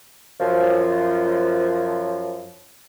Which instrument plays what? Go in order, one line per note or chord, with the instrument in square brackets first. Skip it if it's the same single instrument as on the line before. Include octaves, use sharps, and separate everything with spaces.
[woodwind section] F#2 F3